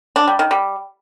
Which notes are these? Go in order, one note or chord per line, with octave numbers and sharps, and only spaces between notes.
D4
G3
D#3
G3